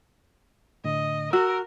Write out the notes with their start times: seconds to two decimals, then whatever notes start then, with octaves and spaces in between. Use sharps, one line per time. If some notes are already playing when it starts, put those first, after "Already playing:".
0.84 A2 D3 D#5
1.33 F#4 A#4 E6